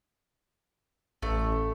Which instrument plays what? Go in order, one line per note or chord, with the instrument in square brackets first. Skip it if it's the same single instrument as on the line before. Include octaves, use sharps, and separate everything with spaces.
[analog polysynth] A1 [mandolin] A3